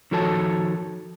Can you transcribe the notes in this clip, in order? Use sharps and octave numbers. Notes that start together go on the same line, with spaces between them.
D#3 F3 F#4 A4 C#5 A5